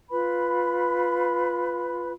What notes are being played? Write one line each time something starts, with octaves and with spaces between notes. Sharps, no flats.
F4 B4 B5